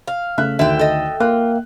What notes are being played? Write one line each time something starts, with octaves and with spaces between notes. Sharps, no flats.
F5
C#3 A3 E5 F#6
D2 D3 D#3 E5 G5
A4 D#5
A#3 F4 F#6